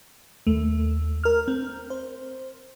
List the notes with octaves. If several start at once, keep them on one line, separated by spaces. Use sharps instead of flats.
D#2 A3
A#4 F6
C4
C5